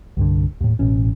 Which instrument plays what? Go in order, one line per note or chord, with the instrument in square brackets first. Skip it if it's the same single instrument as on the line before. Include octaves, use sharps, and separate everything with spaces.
[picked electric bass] C2 G2 D3
D#2 A2
A1 B2 C#4